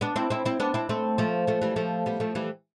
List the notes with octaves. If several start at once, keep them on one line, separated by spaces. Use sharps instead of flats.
B3 D4
C4 E4
C4 E4
C4 E4
B3 D4
C4 E4
A3 C4
F3 A3
F3 A3
E3 G3
F3 A3
G3 B3
F3 A3
E3 G3